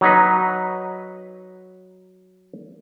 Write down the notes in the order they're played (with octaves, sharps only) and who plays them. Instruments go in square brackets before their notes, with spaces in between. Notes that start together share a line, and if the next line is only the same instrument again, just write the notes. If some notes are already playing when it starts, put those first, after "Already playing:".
[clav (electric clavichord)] F#3 D#4 B4